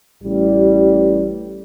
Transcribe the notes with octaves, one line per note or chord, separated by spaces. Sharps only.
A1 G3